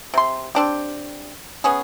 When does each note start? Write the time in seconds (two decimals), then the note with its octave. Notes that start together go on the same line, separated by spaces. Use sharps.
0.14 C3 C6
0.55 C4 D4 G4
1.64 B3 C#4 G#4